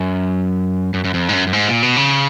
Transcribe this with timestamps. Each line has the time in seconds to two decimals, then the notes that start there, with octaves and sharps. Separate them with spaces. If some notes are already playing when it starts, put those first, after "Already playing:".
Already playing: F#2
0.94 F#2
1.04 F#2
1.14 F2
1.29 G#2
1.33 F#2
1.47 F#2
1.53 G#2
1.68 A#2
1.82 B2
1.96 C#3